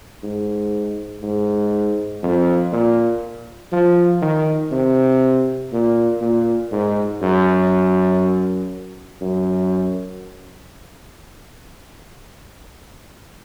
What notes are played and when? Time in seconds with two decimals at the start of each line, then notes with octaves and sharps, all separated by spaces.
0.23 G#2
1.22 G#2
2.23 F2
2.73 A#2
3.73 F3
4.22 D#3
4.72 C3
5.72 A#2
6.21 A#2
6.72 G#2
7.22 F#2
9.21 F#2